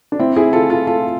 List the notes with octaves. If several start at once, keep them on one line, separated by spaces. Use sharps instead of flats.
D4
C4 E4
E4 G#4
F4 A4
F4 A4
F4 A4